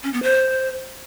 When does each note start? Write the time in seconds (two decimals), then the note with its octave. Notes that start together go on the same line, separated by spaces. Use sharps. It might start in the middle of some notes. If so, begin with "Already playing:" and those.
0.03 C#4
0.13 B3
0.23 C5